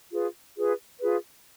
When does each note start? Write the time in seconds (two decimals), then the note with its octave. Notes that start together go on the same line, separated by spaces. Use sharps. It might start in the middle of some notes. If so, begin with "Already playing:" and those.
0.12 F4 G#4 B4
0.56 F4 G#4 B4
1.01 F4 G#4 B4